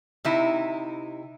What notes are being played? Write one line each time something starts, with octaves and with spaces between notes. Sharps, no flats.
C3 D#4 E4